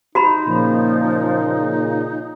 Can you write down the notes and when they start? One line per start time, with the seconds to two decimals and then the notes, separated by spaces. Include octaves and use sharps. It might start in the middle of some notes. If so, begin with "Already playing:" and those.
0.15 D#4 F#4 A#5 B5
0.47 A#2 C#3 F3